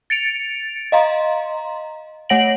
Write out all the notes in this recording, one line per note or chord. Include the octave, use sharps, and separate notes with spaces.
A6 C#7 D7 F7
D#5 F5 A#5 C6
A3 C#5 F#5 A#6 D7 F#7